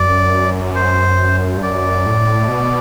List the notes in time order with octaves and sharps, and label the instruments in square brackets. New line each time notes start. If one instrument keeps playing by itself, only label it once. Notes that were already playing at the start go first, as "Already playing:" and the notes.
Already playing: [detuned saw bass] F#2 [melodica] D5
[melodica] C5
[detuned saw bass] G2
[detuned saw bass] F#2 [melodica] D5
[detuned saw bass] A2
B2